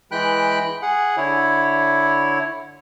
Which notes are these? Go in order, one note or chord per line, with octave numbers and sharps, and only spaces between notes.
E3 G#3 G5 B5 F#6
G#4 F#5
D3 E4 C#5